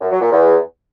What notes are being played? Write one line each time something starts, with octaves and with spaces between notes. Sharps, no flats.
F#2
F#3
A#2
E2